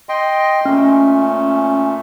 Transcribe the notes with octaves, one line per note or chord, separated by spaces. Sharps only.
D#5 G5 C6
A#2 A3 C#4